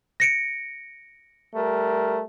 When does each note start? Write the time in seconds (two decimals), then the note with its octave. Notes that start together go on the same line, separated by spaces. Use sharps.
0.20 A#6 C#7 D7
1.55 G3 A3 A#4